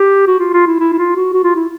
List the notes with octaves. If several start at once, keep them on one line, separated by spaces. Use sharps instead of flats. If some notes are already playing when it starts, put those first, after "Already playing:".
Already playing: G4
F#4
F4
F4
E4
E4
E4
F4
F#4
F#4
F4
E4